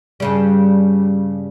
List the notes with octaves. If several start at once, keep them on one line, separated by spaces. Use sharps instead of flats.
G2 C#3 G3